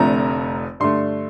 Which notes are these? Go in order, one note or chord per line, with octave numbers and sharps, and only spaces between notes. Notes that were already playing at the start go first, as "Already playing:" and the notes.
Already playing: F1 F2 D3 A3 A#5
G2 D3 A3 C6